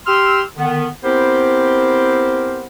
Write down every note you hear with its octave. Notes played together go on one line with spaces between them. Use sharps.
G4 C6 E6 F6
D3 D#3 B3
B3 C4 E4 G4 A#4 C5